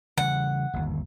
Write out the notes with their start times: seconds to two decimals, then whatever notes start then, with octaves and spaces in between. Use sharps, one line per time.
0.17 C#3 E3 G3 F#5
0.74 G1 D#2